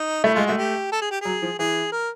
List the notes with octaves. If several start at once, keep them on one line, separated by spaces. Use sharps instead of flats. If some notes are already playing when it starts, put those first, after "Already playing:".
Already playing: D#4
A3 E4
G#3 F4
A3 F#4
G4
A4
G#4
G4
F#3 G#4
F3
E3 G#4
A#4